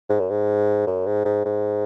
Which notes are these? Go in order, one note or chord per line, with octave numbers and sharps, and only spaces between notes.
G#2
F#2
G#2
F#2
G#2
G#2
G#2